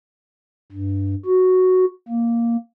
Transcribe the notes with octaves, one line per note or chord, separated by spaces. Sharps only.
G2
F#4
A#3